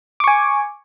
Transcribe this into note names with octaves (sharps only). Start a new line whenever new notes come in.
G#5 C#6 D6